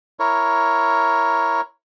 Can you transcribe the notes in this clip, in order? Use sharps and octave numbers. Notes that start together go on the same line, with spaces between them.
E4 A#4 C#5